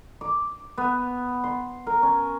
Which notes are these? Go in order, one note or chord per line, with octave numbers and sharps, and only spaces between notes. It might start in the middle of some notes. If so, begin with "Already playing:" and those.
D6
B3
C6
A#4
C#4